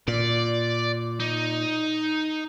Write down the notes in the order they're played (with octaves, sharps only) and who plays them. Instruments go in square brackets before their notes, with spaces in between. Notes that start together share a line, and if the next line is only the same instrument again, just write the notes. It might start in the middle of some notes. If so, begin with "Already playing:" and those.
[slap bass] A#2 [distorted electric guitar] D5
[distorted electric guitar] D#4